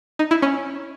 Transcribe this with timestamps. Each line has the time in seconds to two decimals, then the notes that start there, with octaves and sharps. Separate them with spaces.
0.19 D#4
0.31 E4
0.42 C#4